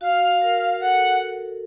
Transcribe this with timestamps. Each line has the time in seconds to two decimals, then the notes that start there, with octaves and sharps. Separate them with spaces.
0.01 F#4 F5
0.41 A#4
0.80 A4 F#5